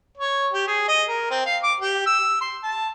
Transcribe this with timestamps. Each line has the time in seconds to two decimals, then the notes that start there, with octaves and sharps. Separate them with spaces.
0.17 C#5
0.53 G4
0.67 G#4
0.88 D#5
1.08 A#4
1.31 C4
1.46 F5
1.63 D6
1.80 G4
2.06 E6
2.41 C6
2.63 A5